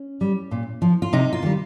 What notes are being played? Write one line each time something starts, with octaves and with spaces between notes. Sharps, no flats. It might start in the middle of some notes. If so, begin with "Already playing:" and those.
Already playing: C#4
G3
A#2
F3
F4
C3 D#4
F4
D#3 G3